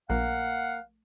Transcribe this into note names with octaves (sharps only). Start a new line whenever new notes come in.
A#1 A#3 F5 F#5